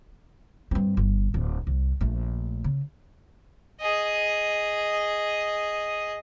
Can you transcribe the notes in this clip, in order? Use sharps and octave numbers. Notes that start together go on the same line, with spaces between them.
G2 C4
G1
D1
C2
A#1 A3
C#3
G#4 D#5